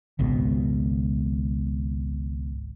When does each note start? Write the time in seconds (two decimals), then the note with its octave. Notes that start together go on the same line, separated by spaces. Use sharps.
0.19 G#1 C#2 B2